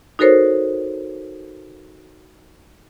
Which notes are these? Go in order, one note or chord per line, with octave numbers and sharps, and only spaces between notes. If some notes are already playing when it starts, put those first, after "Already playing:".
D#4 F#4 A4 A#4 C5 C#5